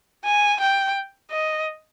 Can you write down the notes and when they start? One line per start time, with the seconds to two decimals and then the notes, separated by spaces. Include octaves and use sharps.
0.25 G#5
0.60 G5
1.30 D#5